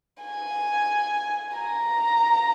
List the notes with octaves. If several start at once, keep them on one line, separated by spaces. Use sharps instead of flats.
G#5
A#5